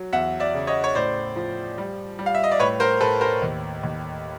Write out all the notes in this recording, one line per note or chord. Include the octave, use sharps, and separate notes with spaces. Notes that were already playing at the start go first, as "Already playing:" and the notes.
Already playing: F#3
E2 E5 F#5
D5 E5
C#3
C#5 D#5
C#5
A2 C5 D5
F3
G3
G3
F5
E5
D#5
D5
A2 B4 C#5
A#4 C5
A2 A4 B4
A#4 C5
D#2
D#2